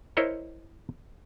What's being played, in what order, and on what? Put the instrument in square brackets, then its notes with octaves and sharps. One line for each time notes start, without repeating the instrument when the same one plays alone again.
[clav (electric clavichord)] E4 A#4 C5 C#5 D#5